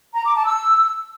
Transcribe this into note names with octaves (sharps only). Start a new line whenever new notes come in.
A#5
D6
A5
E6